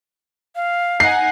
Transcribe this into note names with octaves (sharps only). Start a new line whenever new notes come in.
F5
D#4 F#5 G#5 C7